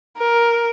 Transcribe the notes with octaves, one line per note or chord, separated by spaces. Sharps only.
A#4